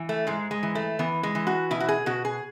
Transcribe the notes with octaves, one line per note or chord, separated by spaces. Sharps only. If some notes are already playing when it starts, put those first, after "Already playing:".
Already playing: E3
A3
G#2 G#3
G#3
E3
A3
E3 B3
G#3
E3
F#4
B2 E4
F#4
G#4
B2 F#4
G#4